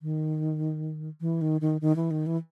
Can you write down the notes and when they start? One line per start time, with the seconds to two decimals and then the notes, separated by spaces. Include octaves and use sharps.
0.02 D#3
1.21 E3
1.41 D#3
1.61 D#3
1.81 D#3
1.96 E3
2.11 D#3
2.26 E3